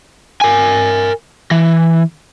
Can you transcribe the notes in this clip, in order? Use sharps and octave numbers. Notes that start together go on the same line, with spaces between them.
A#4 G#5
E3